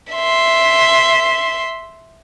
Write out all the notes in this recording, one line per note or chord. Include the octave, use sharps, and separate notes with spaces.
E5 C6